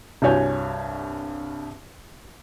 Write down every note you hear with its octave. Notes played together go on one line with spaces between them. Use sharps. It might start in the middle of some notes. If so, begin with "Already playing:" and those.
C2 G2 F#4 C#5 G#5 G6